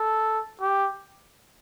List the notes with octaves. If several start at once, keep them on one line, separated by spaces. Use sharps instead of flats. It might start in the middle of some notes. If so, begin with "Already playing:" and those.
Already playing: A4
G4